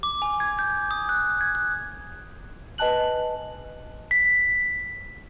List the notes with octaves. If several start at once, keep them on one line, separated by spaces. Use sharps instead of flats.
D6
G#5
G#6
G6
D#6
F#6
G#6
F#6
B4 D#5 G#5 A5 F#6 F#7
B6